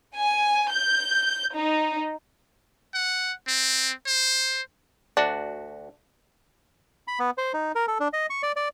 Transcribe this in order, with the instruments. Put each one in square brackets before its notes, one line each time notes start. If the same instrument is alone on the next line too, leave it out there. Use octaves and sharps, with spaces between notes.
[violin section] G#5
G6
D#4
[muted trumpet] F#5
C4
C5
[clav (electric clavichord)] D2 F#4 [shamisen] D4
[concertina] B5
B3
C5
D#4
A#4
A4
D4
D#5
C#6
D5
D5